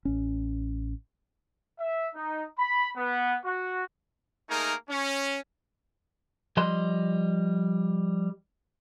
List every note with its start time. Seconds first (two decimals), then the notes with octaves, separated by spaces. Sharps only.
0.05 A1 C#4
1.78 E5
2.15 D#4
2.58 B5
2.96 B3
3.44 F#4
4.49 A3 A#3 D#4 G#4 A#4
4.88 C#4
6.57 F3 G3 D#5 C6